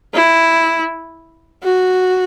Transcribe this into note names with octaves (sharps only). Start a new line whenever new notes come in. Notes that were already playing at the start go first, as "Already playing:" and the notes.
E4
F#4